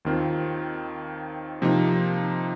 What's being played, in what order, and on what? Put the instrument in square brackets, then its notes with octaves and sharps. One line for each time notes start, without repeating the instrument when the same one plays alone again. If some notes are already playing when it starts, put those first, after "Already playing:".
[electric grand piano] D#2 D#3 C4 F4
C3 F3 A#3 D#4